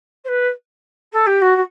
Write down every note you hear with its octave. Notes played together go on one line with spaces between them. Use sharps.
C5
B4
A4
G4
F#4
F#4